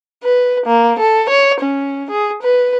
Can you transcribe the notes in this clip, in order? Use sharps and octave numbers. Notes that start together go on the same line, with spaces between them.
B4
A#3
A4
C#5
C#4
G#4
B4